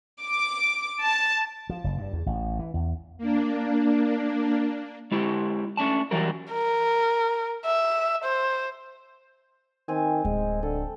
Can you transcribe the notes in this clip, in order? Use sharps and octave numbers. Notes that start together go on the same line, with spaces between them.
D6
A5
F3
F#1
G2
E2
A1
E3
E2
A#3 D4
G#3 E4 G4
A3 C#4 D4 A5
E3 F#3 G3 A#4
A#4
E5
C5
D#3 C4 G#5
D1 G#3
D3 A4